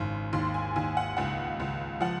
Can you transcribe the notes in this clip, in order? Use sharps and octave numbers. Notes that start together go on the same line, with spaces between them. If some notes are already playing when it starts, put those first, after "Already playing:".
Already playing: G#1 C#3 C6
D#2 C6
G#5
D#2 G#5
F#5
C#2 F#5
C#2
F3 F#5